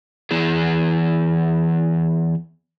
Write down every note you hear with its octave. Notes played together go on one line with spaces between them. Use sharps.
E3 B3 E4 G#4